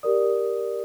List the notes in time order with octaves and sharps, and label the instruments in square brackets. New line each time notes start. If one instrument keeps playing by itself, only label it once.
[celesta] G4 A#4 D5 D#6